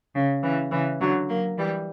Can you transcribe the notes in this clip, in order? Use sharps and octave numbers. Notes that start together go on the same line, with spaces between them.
C#3
C#3 E3
C#3 E3
D3 F#3
F#3 A#3
E3 G3